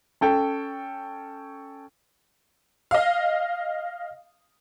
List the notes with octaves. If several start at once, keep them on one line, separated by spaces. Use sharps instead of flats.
C#4 A4 G5
D#5 F5